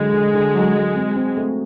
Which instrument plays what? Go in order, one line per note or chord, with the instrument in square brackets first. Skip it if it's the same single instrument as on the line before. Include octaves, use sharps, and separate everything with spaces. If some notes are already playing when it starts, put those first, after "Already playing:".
Already playing: [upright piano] D3 F#3 [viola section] G#3
[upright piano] D3
D3
F#3
F#3
C4
C4
A3